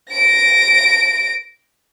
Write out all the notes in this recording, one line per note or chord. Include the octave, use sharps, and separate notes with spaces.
A#6 D7